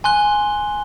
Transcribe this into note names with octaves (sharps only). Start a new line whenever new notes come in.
G#5 C6 F#6 G7